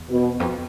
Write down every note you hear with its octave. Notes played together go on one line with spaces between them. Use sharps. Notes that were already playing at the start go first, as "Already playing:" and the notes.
Already playing: E2
B2
F2